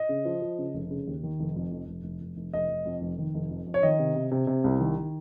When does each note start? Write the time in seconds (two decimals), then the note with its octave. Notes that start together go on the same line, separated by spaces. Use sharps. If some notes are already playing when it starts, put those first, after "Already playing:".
Already playing: D#5
0.09 C#3
0.25 F3
0.42 F3
0.58 C#3
0.74 F1
0.91 C#3
1.07 D#2
1.23 D#3
1.39 F1
1.56 F2
1.71 F1
1.87 F1
2.04 F1
2.21 F1
2.36 F1
2.53 F1 D#5
2.69 F1
2.86 F2
3.01 F1
3.18 D#3
3.34 F1
3.50 F2
3.66 F2
3.74 C#5
3.83 D#3 D#5
3.99 C3
4.15 C3
4.31 C3
4.47 C3
4.64 C2
4.80 D#3
4.97 D#3